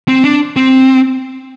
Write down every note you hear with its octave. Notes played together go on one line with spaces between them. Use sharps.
C4
D4
C4